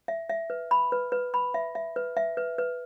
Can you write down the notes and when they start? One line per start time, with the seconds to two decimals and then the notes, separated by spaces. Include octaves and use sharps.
0.08 E5
0.29 E5
0.50 B4
0.71 B5
0.92 B4
1.12 B4
1.34 B5
1.54 E5
1.75 E5
1.96 B4
2.17 E5
2.37 B4
2.58 B4